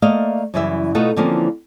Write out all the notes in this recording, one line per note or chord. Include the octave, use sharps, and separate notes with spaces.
A3 A#3 D5 D#5 F5
F#2 C#3 E3 G3 G4 E5
B2 A3 D#4 F4 A4 F#5
D3 E3 F3 A#3 C4 C#4